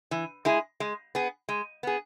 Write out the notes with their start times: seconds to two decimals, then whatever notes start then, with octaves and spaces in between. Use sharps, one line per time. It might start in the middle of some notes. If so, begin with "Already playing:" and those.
0.11 E3
0.45 G#3 E4 G#4
0.80 G#3
1.15 B3 G#4
1.49 G#3
1.83 B3 G#4